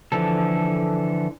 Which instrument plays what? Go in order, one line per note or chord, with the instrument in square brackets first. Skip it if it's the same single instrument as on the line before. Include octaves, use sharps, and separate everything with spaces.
[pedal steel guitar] D3 E3 F3 A4